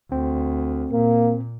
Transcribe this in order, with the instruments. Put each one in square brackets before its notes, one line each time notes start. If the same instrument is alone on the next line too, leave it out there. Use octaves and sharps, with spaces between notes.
[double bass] D2 [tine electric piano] C4
[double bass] A#2 [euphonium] A#3